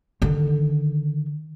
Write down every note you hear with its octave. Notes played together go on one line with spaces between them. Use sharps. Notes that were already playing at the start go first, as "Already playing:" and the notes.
D3 D#3